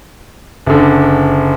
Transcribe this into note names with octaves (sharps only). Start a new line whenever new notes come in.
F#1 D3